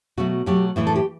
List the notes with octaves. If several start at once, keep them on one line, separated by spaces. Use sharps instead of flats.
B2 F#3 A3 F#4
B2 F#3 A3 G4
A2 E3 A3
A4
G4